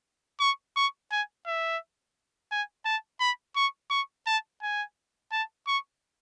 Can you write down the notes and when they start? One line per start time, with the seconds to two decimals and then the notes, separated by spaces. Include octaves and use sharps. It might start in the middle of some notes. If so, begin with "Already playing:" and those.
0.40 C#6
0.76 C#6
1.12 G#5
1.46 E5
2.52 G#5
2.86 A5
3.21 B5
3.56 C#6
3.91 C#6
4.27 A5
4.62 G#5
5.32 A5
5.67 C#6